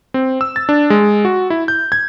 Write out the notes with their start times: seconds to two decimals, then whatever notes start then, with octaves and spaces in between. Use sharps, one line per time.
0.14 C4
0.41 E6
0.56 A6
0.69 D4
0.90 G#3
1.25 F#4
1.50 E4
1.68 G6
1.92 G#6